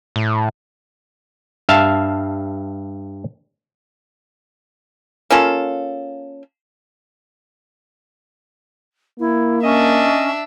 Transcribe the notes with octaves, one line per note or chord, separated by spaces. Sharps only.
A2
G2 E5 F5 A5
A#3 C#4 F4 A4
A#3 E4
C#4 D4 D#5 E5